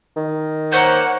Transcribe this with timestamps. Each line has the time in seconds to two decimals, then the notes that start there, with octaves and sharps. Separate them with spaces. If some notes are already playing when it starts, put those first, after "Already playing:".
0.16 D#3
0.73 A#3 C5 C#5 F#5 G6